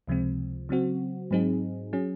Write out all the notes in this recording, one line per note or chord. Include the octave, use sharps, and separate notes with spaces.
C#2 C3 F3 G#3 C4
C#3 F#3 C4 F#4
G#2 F#3 C4 D#4 G#4
F#3 C#4 G#4